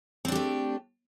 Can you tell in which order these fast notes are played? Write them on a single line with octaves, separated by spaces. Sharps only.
C4 D4 G4 A3